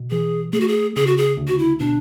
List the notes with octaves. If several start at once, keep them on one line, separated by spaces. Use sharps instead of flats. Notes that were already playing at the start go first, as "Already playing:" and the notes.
Already playing: B2
E3 G#4
A3 G#4
F#4
G#4
C#3 G#4
F#4
G#4
D2
F#4
E4
B2 D4